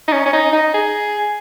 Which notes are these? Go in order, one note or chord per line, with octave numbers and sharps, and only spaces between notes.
D#4
C#4
C#4
D#4
D#4
G#4